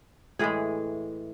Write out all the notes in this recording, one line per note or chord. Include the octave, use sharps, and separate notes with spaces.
A2 E3 G#3 G#4